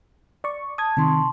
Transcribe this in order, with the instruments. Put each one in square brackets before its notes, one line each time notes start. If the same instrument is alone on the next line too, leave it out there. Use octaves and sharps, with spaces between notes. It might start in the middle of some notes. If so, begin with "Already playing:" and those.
[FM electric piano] D5 C#6
[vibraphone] A5 [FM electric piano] D#6 G#6
[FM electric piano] C3 D#3 [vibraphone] A5 C6 C#6